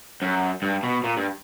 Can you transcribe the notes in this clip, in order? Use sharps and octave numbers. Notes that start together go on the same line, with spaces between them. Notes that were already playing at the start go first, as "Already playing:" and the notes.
F#2
G2
B2
A#2
G2